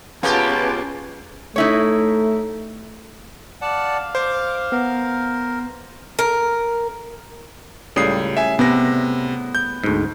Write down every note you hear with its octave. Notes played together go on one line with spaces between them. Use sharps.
C#2 A#3 B3 C#4 F4 G4 B4 A5
A3 D#4 E4 C#5
D5 F5 F#5 A5
C5 D6
B3 A#4
A#4
C#2 A2 C#3 G3 D#6 C7
E5 G#5
C3 B3 A#6
G6
D2 G#2